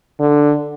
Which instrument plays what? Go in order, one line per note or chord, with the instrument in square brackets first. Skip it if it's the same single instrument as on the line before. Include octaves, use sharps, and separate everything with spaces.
[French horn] D3